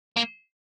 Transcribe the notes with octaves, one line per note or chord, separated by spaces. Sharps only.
A#3